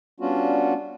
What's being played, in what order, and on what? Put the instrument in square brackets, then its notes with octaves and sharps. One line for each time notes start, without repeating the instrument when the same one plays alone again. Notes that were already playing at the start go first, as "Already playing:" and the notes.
[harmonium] G3 B3 C#4 D4 F4 F#4